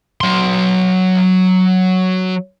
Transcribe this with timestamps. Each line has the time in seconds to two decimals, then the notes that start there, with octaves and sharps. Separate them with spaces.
0.21 F#3 C6